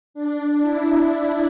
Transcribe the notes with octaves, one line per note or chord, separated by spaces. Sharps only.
D4
E4
D4